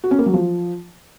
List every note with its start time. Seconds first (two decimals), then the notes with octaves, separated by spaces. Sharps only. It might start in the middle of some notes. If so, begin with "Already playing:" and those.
0.04 F#4
0.11 C#4
0.19 A#3
0.26 F#3
0.34 F3